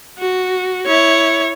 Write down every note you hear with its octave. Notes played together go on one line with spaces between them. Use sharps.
F#4
E4 C#5